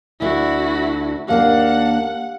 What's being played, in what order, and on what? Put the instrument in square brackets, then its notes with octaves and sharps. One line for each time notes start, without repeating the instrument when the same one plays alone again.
[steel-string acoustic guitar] D2 D4 [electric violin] E4 F#4
[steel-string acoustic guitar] D#2 A#3 D4 [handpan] G4 F5 [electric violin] F#5